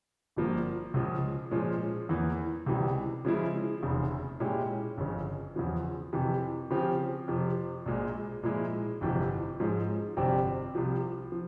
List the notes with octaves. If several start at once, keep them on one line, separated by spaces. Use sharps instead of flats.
G1 G2 F3 A#3
C#2 C#3 F3
A#2 F3 G#3 C#4
E2 E3 A#3
C#2 C3 E3 G3
C#3 F3 G#3 E4
F1 E2 C#3
A#2 G#3 C#4 E4 G4
G1 F2 C#3
E2 C#3 F3
F2 C3 E3
C#3 F3 C4 G4
F2 C3 F3
A#1 A#2 G#3
A#2 F3 G#3 E4
G1 F2 C3 E3
G#2 F3 G#3 C#4
G1 F2 C3 G3 C4
C2 C3 F3
F3